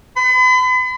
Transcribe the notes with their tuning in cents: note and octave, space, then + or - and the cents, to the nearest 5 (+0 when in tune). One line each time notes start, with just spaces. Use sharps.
B5 +40